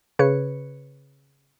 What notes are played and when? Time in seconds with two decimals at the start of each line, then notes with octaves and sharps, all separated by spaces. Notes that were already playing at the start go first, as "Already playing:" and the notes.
0.19 C#3 B4 C#5 C#7